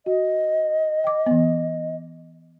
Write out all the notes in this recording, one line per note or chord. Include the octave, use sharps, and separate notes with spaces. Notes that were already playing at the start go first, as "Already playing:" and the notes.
F#4 D#5
G5 D6
E3 B3